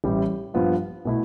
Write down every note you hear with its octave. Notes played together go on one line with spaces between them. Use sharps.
A1 A2 E3 G3
G2 F3 B3 F4
B2 A3 E4